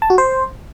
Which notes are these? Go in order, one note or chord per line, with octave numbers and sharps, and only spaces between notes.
A5
F#4
C5